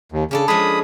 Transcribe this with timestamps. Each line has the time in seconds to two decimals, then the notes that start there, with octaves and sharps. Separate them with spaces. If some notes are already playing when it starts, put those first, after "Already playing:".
0.12 D#2
0.31 C#3 C#4 D4 A4
0.48 F3 G#3 B5 D#6